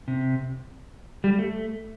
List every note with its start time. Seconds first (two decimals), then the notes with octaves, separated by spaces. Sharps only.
0.08 C3
1.24 G3
1.39 A3